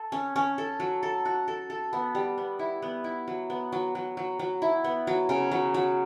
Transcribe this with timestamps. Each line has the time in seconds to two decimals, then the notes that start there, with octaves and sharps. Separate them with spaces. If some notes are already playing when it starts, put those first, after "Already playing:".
Already playing: A4
0.12 C#4
0.36 C#4
0.58 A4
0.80 F#3
1.03 A4
1.25 F#4
1.48 A4
1.70 A4
1.93 B3
2.15 G3
2.38 B3
2.59 E4
2.82 B3
3.04 E4
3.28 F#3
3.50 B3
3.72 F#3
3.95 F#3
4.17 F#3
4.39 F#3
4.62 E4
4.84 B3
5.07 F#3
5.29 C#3
5.51 F#3
5.74 F#3